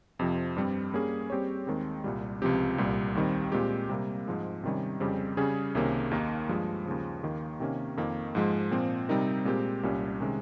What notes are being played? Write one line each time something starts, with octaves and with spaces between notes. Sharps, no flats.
F2 C3 F3
G2 G3 C4
G3 A#3 C#4 G#4
G3 C4 G4 C#5
D#2 D#3 G#3 C4
C2 A#2 G3
C#2 C3 F3 C4 G4
C2 A#2 G3
D#2 D#3 G3 C4
A#2 G#3 C4 G4
C3 G3 A#3
G#2 F3 G#3
C3 D#3 G3 C#4
F2 C#3 G3 C4 G4
C#3 G3 C#4 G#4
C2 C3 D#3 A#3 C#4
D#2 D#3 A#3 D#4
G2 F3 G#3
D#2 C#3 F3
D#2 D#3 A#3
C3 D#3 A#3 C#4
F2 D#3 A#3
G#2 F3 G#3
A#2 F3 C4
C3 G3 C4 D#4 A#4
A#2 G#3 C4 G4 A#4
C2 A#2 G3 C#4 G4
C3 D#3 G#3 C#4